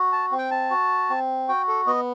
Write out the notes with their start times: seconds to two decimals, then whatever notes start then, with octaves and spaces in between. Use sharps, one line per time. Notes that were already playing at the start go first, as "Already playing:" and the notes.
Already playing: F#4
0.12 A5
0.32 C4
0.38 G5
0.51 A5
0.70 F#4
1.10 C4
1.49 F#4 G5
1.68 A4
1.87 B3 D#5